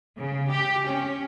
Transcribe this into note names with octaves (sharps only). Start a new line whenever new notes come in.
C#3
G4
C#4